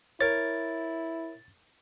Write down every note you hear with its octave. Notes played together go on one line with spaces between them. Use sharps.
E4 A#4 C#5 A6